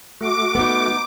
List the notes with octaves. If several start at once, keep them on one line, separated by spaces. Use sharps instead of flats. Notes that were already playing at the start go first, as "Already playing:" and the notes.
A3 F#4 D6
B3 D#4